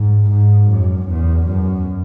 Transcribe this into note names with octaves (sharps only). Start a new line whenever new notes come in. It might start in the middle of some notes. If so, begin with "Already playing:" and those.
Already playing: G#2
G#2
F#2
E2
F#2